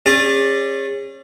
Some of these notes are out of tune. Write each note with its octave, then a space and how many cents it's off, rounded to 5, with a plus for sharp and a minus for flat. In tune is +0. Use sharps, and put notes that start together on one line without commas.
C#4 -30 G#4 -35 D5 +0